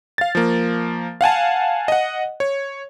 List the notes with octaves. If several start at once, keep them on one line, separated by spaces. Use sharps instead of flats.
F5 A6
F3 A#3
F5 F#5 G#5 A5
D#5 F#5
C#5